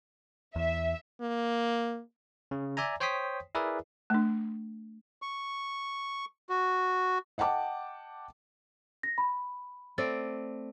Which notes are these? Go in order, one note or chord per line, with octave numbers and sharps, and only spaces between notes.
E2 E5
A#3
C#3
D5 E5 G#5 A#5
C5 C#5 G5 C6 D#6 B6
E4 G#4 A#4 B4 D5 E5
A3 D4
C#6
F#4
D#5 F#5 G5 A5 D6
A#6
B5
A3 C4 D5